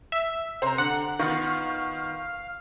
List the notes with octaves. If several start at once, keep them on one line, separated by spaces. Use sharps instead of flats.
E5
C3 C5 A#5
D3 F#5
D#3 B3 F4 F#4 F5